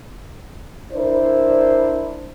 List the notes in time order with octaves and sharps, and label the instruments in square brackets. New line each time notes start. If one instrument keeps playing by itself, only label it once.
[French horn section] D4 E4 A#4 C5 D5